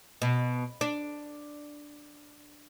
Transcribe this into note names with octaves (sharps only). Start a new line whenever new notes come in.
B2
D4